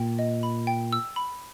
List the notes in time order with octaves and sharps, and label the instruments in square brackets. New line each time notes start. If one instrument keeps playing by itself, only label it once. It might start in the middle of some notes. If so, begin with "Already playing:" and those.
Already playing: [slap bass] A#2 [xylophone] G5
[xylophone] D#5
B5
G5
E6
B5